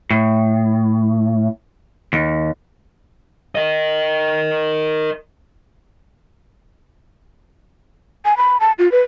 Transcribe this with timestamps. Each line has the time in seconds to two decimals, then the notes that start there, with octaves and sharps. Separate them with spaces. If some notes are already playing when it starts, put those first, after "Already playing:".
0.11 A2
2.13 D#2
3.55 A#4 D#5
8.25 G#5
8.37 B5
8.60 A5
8.79 F4
8.92 B4